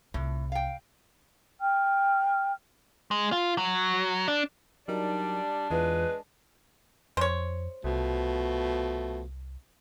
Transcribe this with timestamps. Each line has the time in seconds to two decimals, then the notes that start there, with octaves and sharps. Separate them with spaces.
0.14 C2 A2 F4
0.52 F5 G5
1.59 G5 F6
3.11 G#3
3.32 F4
3.58 F#3
4.28 D4
4.88 F#3 G3 D4 D#4 A#4
5.70 E2 E3 G#3 F4 B4
7.17 F2 C5 C#5
7.84 C2 B2 F3 A3